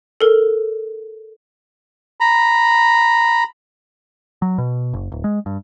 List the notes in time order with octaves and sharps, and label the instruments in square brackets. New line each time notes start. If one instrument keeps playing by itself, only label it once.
[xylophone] A4 A#4
[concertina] A#5 B5
[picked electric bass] F#3
B2
F#1
D1
G#3
G2